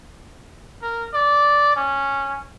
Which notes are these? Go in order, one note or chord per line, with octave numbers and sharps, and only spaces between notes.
A#4
D5
C#4